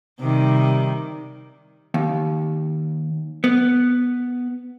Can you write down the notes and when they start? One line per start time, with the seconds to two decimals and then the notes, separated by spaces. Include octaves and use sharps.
0.19 C3 D#3 G3
1.94 D#2
3.44 B3